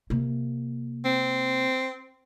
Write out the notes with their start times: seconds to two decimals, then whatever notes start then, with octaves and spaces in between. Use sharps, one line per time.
0.10 C3 A#3
1.05 C4